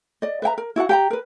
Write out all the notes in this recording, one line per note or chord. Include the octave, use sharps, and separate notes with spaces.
D5 D#5
B4 E5 G5 A#5
A#4
E4 F#4 D5 F#5
G4 G5 A#5
A#4 B4